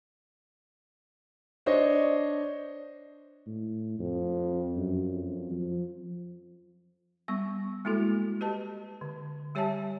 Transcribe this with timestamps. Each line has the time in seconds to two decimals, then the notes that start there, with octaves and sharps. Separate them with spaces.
1.66 D4 C5 C#5 D#5
3.46 A2
3.99 F2
4.76 F#2
5.12 F2
5.51 F3
7.28 G3 B3 C#6
7.85 G#3 A#3 E4 F#4 A4
8.41 G4 B4 D#5 A5
9.01 D3
9.55 G3 G4 C#5 E5 G#5 A5